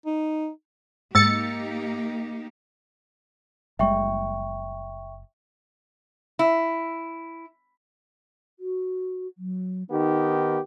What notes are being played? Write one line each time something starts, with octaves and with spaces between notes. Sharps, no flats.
D#4
G#2 A#3 D#4 G4 E6 A6 C#7
F#1 G3 G#3 E5 G5 C#6
E4
F#4
F#3
D#3 B3 D#4 G4